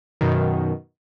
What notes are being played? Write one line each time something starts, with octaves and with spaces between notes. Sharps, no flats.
F#2 B2 D#3